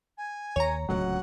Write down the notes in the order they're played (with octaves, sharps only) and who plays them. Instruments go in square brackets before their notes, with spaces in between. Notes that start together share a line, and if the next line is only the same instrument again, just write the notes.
[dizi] G#5
[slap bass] D#2 [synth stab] C#5 A#5
[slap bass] D1 C#2 G#3 [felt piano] F#3 [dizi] F#5